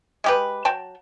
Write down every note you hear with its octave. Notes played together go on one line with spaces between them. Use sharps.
G#3 G4 B4
F#3 G5 A5